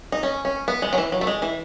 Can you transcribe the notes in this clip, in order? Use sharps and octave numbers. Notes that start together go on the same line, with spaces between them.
D#4
C#4
C#4
B3
G#3
F#3
E3
F#3
A3
G#3
E3